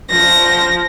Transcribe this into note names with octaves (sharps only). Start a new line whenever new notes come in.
F3 A#6